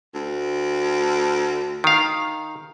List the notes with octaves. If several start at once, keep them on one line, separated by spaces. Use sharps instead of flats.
D2
D#3 F5